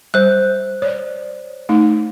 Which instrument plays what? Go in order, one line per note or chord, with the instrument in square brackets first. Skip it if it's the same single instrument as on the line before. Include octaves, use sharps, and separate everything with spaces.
[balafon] G3 [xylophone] C5 F#6
[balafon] C#5 D5
A3 D#4